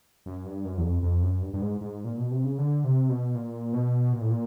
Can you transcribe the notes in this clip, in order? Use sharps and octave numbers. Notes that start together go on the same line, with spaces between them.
F#2
G2
F#2
E2
F2
F2
F#2
G2
G2
G#2
G#2
A#2
B2
C3
C#3
D3
C3
B2
A#2
B2
A#2
A2
A#2